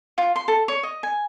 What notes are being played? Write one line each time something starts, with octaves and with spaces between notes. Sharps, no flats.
F4
C6
A4
C#5
D#5
G#5